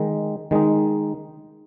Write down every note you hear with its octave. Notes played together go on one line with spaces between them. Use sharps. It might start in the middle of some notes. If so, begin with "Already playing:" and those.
Already playing: D#3 G#3 D#4
D#3 G#3 D#4